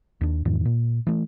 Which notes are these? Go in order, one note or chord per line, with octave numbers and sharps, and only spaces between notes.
D#2 D4
E2 G#2 D#3
A#2
E3 A3